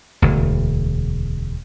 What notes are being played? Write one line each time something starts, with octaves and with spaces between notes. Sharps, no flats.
E1 D2